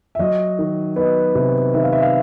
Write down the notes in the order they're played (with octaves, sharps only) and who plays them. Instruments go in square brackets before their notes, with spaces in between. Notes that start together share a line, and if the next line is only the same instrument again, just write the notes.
[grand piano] E5
F#3 D#5
D#3
B3 D#5
C3
D#3 E5
F5
E5
F5